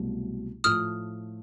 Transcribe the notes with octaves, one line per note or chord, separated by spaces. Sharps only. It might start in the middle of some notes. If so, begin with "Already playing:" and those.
Already playing: C2 B2 F#3 A3
A2 F3 A3 D#6 F6